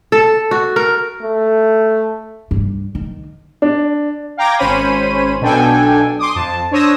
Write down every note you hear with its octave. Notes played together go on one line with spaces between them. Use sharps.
A4
F#4
A#4
A3
G2
D#3
D4
F5 G5 A#5 D6 G#6 A#6
G#1 C#4 C5 C#5 B5 D#7
B1 B2 D4 A4 G5 G#5
C6 D6 D#6
F2 A5
D4 C5 C#5 D#6 E6 A#6